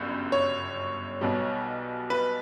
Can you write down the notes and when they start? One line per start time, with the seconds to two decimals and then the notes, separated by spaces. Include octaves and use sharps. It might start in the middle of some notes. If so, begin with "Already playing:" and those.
Already playing: G1 F#2 C#3 G3
0.32 C#5
1.21 B1 B2 G3
2.10 B4